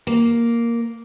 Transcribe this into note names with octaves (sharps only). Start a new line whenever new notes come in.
A#3